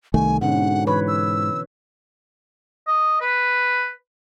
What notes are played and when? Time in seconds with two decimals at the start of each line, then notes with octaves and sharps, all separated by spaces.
0.14 C2 D#3 A3 G#5
0.41 G#2 B2 D3 C#4 F#5
0.87 E3 B4 C#5 B5
1.08 E6
2.87 D#5
3.21 B4